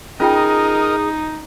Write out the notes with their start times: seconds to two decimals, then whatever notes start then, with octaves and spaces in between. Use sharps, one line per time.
0.20 C#4 D#4 F4 G#4 A#4 D#5 G5